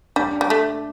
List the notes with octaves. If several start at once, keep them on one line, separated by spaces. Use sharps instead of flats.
G3 D4
G3
A3